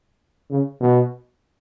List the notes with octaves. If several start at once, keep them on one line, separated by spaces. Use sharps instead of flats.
C#3
B2